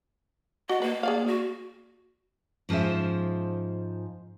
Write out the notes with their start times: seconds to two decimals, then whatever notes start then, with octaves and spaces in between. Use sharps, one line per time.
0.69 F#4 D#5
0.82 A#3 B4
1.03 G#4 D5 F5
1.27 F#4
2.69 G#2 F3 C#4 C5 E5